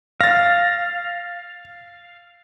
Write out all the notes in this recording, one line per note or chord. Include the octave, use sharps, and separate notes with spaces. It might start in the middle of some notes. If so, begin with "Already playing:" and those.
F5 A6 A#6